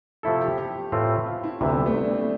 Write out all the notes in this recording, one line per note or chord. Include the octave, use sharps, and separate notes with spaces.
C3 F3 A3 E4 A4
G4
G4
A2 E3 A3 C4 F4
F4
E4
D2 C3 E3 C4
B3
G3
A3
E4
D4
C4
A3